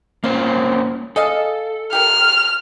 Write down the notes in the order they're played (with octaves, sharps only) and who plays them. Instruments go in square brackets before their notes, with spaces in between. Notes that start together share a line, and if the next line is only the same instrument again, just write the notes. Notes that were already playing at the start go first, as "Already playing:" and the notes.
[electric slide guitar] A#3 C#4 C5 [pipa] F4
[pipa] G#4 D#5 F5 [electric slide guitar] A4
[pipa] G4 A#4 [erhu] F6